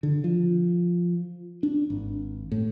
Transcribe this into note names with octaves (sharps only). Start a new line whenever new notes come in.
D3
F3
D4
G#1
A2